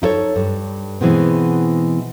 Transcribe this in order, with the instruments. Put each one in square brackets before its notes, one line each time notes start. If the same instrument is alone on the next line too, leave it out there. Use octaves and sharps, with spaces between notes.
[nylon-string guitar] D#4 E4 A4 C#5
G2
B2 E3 G#3 B3 C4